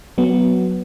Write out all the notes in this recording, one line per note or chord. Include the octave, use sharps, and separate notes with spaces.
F#3 B3